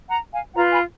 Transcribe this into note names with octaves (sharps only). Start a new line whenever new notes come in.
F#5 A#5
F5 G#5
F4 B4 F#5 A#5
G#5 B5